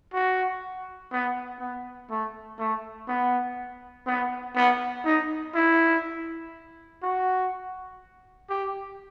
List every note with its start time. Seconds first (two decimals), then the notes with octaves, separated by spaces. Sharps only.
0.14 F#4
1.12 B3
1.60 B3
2.11 A3
2.59 A3
3.08 B3
4.07 B3
4.56 B3
5.05 D#4
5.54 E4
7.03 F#4
8.50 G4